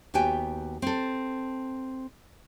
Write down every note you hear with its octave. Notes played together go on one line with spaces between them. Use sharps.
D#2 B3 F#4 G4 G5 G#5
C4 A4